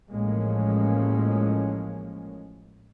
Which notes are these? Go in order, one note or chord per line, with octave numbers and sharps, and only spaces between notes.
A1 A2 F3 G#3 A#3 C#4